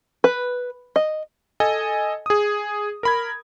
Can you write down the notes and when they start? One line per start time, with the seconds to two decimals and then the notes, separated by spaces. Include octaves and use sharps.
0.24 B4
0.96 D#5
1.60 A4 D#5 G#5
2.26 G#4 D#6
3.03 A#4 B5 G#6